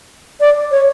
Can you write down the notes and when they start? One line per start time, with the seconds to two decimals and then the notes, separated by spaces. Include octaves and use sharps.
0.40 D5
0.71 C#5